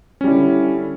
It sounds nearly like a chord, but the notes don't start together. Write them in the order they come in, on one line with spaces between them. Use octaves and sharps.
C#4 G3 E4 D3